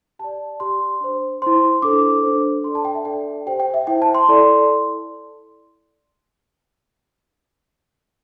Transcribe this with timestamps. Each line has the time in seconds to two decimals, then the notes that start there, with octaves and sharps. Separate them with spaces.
0.19 G4 D5 A5
0.60 G4 D5 C6
1.01 D4 C5
1.42 E4 C5 C6
1.82 D4 A4 C5 D6
2.23 D4 A4 C5
2.64 D4 A4 D5 C6
2.75 A5
2.85 G5
2.95 E5
3.05 D4 A4 D5 G5
3.46 G4 C5 G5
3.60 G5
3.74 E5
3.87 E4 C5 G5
4.02 A5
4.15 C6
4.29 E4 A4 D5